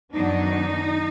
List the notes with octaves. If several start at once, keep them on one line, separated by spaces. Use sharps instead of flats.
F#2 D#3 F#3 B3 D4 D#4